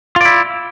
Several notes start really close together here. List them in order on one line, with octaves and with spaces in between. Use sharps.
F4 D5 E4